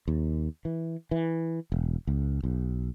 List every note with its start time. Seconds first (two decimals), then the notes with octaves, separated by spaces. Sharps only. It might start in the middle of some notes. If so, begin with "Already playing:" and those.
0.08 D#2
0.65 E3
1.11 E3
1.72 E1
2.07 C#2
2.44 B1